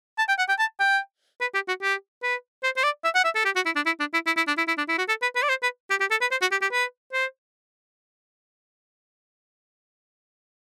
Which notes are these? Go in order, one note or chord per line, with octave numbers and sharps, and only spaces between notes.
A5
G5
F#5
G5
A5
G5
B4
G4
F#4
G4
B4
C5
C5
D5
E5
F#5
E5
A4
G4
F#4
E4
D4
E4
D4
E4
E4
E4
D4
E4
E4
D4
E4
F#4
A4
B4
B4
D5
C5
B4
G4
G4
A4
B4
C5
F#4
G4
G4
B4
C5